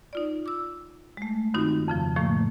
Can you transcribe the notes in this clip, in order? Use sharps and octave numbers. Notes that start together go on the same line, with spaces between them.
D#4 F4 D5
D6 E6
G#3 A3
G2 D#3 C4 D#4 F4 F#4
F2 C#3 F3
A2 D#3 F3 A3 A#3